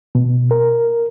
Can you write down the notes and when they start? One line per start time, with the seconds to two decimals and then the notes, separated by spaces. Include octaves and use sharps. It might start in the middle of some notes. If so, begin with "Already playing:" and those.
0.15 B2
0.51 A#4